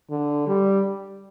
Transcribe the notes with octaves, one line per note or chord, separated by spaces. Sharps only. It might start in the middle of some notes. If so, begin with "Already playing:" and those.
D3
G3